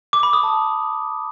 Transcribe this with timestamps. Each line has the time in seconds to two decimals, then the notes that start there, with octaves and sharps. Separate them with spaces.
0.13 D6
0.23 B5
0.33 D#6
0.43 A5